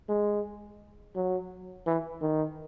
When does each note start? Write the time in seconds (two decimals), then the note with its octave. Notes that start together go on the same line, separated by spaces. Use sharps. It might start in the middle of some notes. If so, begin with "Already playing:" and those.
0.09 G#3
1.16 F#3
1.87 E3
2.22 D#3